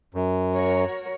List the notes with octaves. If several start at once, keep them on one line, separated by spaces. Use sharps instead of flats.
F#2
F#4 A#4 C#5